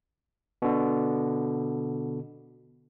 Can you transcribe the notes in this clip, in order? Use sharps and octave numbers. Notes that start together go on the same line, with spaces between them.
B2 D3